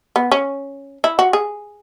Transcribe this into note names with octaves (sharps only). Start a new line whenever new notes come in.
B3
C#4
E4
F#4
G#4